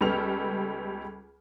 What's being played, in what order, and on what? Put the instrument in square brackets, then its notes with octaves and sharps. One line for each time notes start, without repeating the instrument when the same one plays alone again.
[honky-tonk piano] C#2 G3 B3 A4 F6 F7